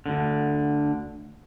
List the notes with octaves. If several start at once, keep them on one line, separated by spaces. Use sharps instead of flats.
D2 D3